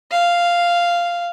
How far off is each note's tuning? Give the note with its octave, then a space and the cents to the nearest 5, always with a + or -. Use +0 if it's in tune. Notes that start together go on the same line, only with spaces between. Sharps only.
F5 -5